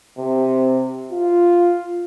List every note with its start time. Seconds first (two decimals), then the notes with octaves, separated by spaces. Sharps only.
0.17 C3
1.12 F4